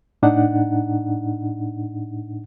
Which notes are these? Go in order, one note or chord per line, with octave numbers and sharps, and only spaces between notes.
A2 D4 D#4 F#5